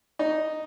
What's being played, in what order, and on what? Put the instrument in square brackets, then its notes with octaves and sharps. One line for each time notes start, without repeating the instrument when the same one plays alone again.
[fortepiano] D#4